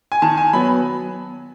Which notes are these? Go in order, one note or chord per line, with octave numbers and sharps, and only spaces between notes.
G#5
D#3 A5
G#5
F#3 B3 B5